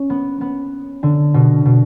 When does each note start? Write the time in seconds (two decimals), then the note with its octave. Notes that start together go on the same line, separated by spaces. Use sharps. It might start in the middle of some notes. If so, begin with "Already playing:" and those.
Already playing: C#4
0.10 B3
0.41 B3
1.03 D3
1.34 B2
1.65 B2